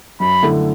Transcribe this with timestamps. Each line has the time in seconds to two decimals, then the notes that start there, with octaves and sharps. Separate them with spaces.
0.20 F#2 B5
0.43 D3 A3 E4